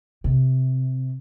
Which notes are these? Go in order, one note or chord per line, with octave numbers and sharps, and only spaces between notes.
C3